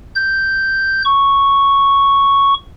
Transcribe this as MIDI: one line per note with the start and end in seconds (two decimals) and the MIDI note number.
0.15 1.02 91
1.05 2.54 85